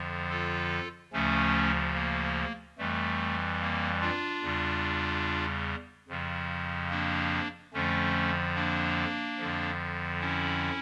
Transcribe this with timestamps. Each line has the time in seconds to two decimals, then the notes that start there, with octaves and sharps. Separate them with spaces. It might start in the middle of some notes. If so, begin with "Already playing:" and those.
Already playing: F2 D3 F3
0.30 F4 A4
1.13 D2 C#3 F3 A3 C#4
1.95 A#3
2.78 F2 E3 G3 A3
3.61 A#3
4.01 D4 F4
4.42 E2 C#3 G3
6.08 F2 C#3 F3
6.90 A#3 D4
7.73 F2 D3 F3 A3 C#4
8.55 A#3 D4
9.38 F2 D3 F3
10.20 C#4 E4